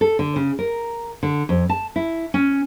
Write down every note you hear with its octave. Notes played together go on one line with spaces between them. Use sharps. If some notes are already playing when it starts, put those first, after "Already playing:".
A4
D3
C#3
A#4
D3
F2
A5
E4
C#4